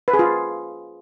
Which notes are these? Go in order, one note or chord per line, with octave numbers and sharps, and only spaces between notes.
B4
G#4
F4